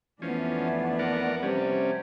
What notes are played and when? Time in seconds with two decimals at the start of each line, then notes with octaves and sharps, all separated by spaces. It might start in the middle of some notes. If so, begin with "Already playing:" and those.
0.22 F2 E3 F3 A3 B3 C#4 D4
0.99 A#4 D5 F#5
1.43 C3 G3 C#4